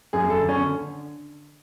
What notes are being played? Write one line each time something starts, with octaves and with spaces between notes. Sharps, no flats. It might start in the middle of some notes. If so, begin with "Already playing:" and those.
F#2 G#4
A4
D3
C#4
D3